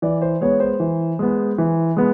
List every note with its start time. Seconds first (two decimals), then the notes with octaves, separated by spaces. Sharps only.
0.02 E3 D5
0.22 C5
0.41 G#3 B3 C#5
0.60 C5
0.80 E3
1.19 G#3 B3
1.58 E3
1.97 G#3 B3